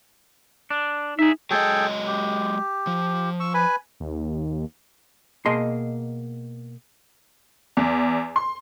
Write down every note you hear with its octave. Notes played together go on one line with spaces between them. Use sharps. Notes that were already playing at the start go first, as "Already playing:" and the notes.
D4
D#4 G#4 E5
F#3 G#3 G#4 A4 D#5 G5
G4
F3
C#6 E6
B4 G#5 B5
D#2
B2 A#3 G#4 D#5 A5 C6
E2
C6